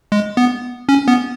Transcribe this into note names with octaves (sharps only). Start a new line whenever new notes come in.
G#3
B3
C#4
B3